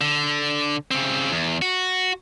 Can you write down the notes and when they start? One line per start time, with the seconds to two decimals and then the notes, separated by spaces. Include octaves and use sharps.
0.01 D3
0.91 C#3 C4
1.32 E2
1.62 F#4